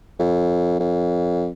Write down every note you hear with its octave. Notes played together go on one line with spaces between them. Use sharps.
F2
F2